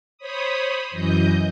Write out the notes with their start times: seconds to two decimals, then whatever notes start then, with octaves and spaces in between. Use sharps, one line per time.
0.18 C5 C#5 B5 D#6
0.91 F#2 E3 D#5 G6